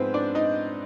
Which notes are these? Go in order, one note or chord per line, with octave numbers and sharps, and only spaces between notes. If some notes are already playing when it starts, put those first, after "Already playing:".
Already playing: G#2 F3 G#3 B3 C4 B4 C5
D4 D5
D#4 D#5